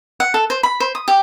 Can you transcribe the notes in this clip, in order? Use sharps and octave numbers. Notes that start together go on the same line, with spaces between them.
F#5
A4
C5
B5
C5
D#6
G4